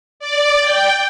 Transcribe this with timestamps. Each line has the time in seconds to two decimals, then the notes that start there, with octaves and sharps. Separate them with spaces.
0.20 D5
0.61 G5